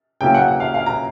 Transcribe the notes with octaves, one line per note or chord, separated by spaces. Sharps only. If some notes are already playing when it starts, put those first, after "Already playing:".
C#3 F#3 A#3 C#4 E4 G5
F#5
F#5
F5
F5
A#5